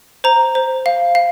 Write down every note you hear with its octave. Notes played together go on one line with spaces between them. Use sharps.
C5 A#5
C5
F5
F5